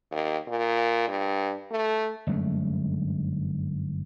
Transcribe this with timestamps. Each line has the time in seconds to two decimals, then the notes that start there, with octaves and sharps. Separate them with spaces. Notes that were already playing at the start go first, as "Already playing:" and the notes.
0.11 D#2
0.48 A#2
1.08 G2
1.72 A3
2.27 G1 F#2 G#3 A3